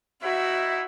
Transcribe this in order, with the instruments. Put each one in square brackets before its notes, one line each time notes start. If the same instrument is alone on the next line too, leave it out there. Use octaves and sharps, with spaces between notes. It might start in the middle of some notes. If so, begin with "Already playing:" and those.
[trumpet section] D#4 E4 [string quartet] F#4 E5 F#5